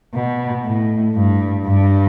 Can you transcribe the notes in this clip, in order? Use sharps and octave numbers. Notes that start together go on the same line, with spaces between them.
B2
A2
G2
G2